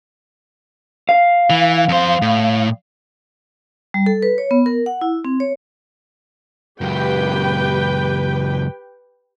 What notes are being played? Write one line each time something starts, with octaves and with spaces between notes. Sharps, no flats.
F5
E3
F2 C5
A2
G3
A4
B4
C#5
B3
A#4
F#5
E4
C4
C#5
C#2 F#2 G4 B4 G5